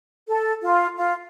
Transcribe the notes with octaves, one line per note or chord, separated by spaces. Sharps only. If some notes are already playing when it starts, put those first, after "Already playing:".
A4
F4
F4